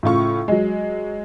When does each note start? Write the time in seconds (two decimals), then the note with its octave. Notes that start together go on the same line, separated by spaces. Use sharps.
0.03 A2 C#3 F4 C#6
0.48 F#3 G#3